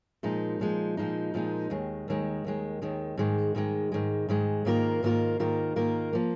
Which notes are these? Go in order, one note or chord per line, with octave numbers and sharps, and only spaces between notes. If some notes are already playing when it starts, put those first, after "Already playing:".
A#2 F3 G#3 D#4
A#2 F3 G#3 D#4
A#2 F3 G#3 D#4
A#2 F3 G#3 D#4
D#2 D#3 G#3
D#2 D#3 G#3
D#2 D#3 G#3
D#2 D#3 G#3
G#2 D#3 G#3
G#2 D#3 G#3
G#2 D#3 G#3
G#2 D#3 G#3
G#2 D#3 A#3 F4 A#4
G#2 D#3 A#3 F4 A#4
G#2 D#3 A#3 F4 A#4
G#2 D#3 A#3 F4 A#4
F3 A#3